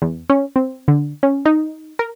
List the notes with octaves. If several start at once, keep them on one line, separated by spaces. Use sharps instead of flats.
E2
C#4
C4
D3
C#4
D#4
A#4